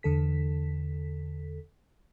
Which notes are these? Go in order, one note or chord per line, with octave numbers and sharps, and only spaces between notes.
E2 D3 A4 B6